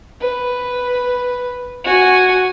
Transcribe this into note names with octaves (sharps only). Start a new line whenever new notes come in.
B4
F#4 G#5